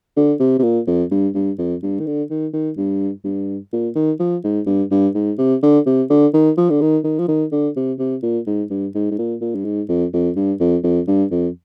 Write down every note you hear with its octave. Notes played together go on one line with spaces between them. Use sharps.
D3
C3
C3
A#2
F2
G2
G2
F2
G2
D#3
D3
D#3
D#3
G2
G2
A#2
D#3
F3
G#2
G2
G2
G#2
C3
D3
C3
D3
D#3
F3
D3
D#3
D#3
F3
D#3
D3
C3
C3
A#2
G#2
G2
G#2
G#2
A#2
A#2
G2
G#2
F2
F2
G2
F2
F2
G2
F2